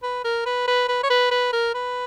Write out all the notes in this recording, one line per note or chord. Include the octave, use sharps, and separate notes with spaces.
B4
A#4
B4
B4
B4
C#5
B4
B4
A#4
B4